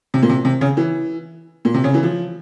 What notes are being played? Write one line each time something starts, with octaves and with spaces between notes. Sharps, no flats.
C3
A#2
C3
C3
C#3
E3
A#2
C3
C#3
E3
F3